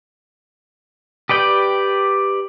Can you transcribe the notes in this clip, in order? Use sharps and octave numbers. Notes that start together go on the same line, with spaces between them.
G4 B4 D5 G5